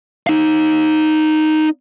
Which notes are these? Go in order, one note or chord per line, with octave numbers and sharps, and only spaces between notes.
D#4 F5